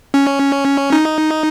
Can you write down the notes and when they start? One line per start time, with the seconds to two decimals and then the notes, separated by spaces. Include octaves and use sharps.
0.14 C#4
0.92 D#4